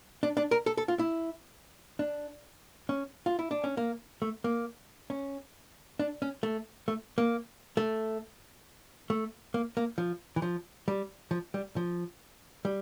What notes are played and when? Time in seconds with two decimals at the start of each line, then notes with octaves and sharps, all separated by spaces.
0.23 D4
0.37 D4
0.51 A#4
0.66 A4
0.77 A4
0.88 F4
0.99 E4
1.99 D4
2.89 C#4
3.26 F4
3.39 E4
3.51 D4
3.64 C#4
3.77 A#3
4.22 A3
4.44 A#3
5.10 C#4
5.99 D4
6.22 C#4
6.43 A3
6.88 A3
7.18 A#3
7.77 A3
9.10 A3
9.54 A#3
9.77 A#3
9.98 F3
10.36 E3
10.42 F3
10.88 G3
11.31 F3
11.54 G3
11.76 F3
12.65 G3